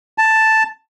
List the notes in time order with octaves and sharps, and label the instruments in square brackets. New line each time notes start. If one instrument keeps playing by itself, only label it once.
[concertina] A5